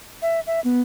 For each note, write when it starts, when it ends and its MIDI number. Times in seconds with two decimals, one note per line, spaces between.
0.22 0.40 76
0.47 0.60 76
0.64 0.82 59